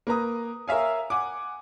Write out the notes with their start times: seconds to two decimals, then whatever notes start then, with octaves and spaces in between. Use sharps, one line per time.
0.07 A#3 B4 A#5 D#6
0.68 A#4 C#5 E5 F5 G#5
1.10 F#5 G#5 D6